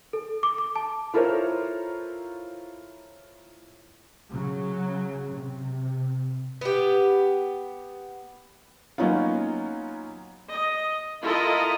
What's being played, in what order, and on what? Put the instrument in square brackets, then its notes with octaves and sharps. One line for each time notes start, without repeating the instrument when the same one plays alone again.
[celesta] A4
D6
D6
A5
[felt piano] E4 F4 A4 A#4 C5 C#5
[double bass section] C#3 F#3
C3
[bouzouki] B3 G4
[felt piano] F#3 A#3 B3 C#4 D#4 F4
[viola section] D#5
E4 F4 A4 A#4 D#5